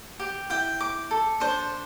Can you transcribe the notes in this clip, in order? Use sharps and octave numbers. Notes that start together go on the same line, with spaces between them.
G4
E4 G5
D6
A4
D4 C5